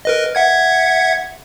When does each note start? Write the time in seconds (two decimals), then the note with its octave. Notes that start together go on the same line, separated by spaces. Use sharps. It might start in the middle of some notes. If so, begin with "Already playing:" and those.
0.05 A#4 B4 D#5
0.35 E5 F#5 G#6